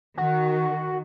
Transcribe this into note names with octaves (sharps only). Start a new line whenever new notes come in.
D#3 F#4